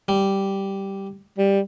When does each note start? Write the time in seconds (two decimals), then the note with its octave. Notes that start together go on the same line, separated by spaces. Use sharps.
0.08 G3
1.38 G3